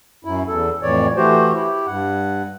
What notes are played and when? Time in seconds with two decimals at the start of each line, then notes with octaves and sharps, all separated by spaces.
0.25 F#2 E4
0.48 E2 A4
0.82 F2 A2 E3 C#5 D5
1.16 E3 A3 F#4 G4 C5
1.54 E4 G4
1.87 G2 F#5